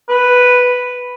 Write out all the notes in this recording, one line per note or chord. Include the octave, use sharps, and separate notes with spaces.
B4